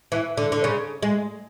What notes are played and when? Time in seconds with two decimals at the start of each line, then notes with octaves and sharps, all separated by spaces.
0.12 E3
0.37 D3
0.52 D3
0.64 C#3
1.02 G#3